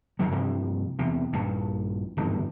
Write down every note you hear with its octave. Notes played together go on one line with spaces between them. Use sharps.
E2 D#3 F#3
G2 C3 F3 G3
E2 C3
A#1 G2 A#2
D1 G#1 E2 G2